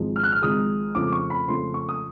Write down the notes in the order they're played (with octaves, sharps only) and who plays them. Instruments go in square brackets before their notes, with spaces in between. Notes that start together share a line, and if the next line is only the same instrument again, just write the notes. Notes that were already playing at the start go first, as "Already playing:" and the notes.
Already playing: [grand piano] G#1 G#2 F3 G#3
F6
F#6
F6
G#1 G#2 F3 G#3 D#6
F2 C#3 F3 A3 D6
C#6
B5
F2 C#3 F3 A3 C6
C#6
D#6